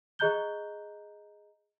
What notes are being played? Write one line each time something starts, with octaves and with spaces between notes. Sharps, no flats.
G#4 D#5 A#5 F#6 G6 G7